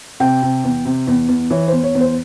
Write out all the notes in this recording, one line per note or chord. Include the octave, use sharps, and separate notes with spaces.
C3 G5
C3
E2
C3
E2
E2
E3 C#5
E2 C5
C#5
E2
C5